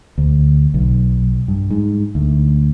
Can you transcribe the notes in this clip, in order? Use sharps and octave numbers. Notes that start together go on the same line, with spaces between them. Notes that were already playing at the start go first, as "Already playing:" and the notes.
D2
B1
G2
G#2
D2